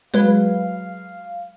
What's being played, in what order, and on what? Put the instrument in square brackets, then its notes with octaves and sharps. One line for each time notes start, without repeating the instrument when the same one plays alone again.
[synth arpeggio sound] F#3 G#3 B4 [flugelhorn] F5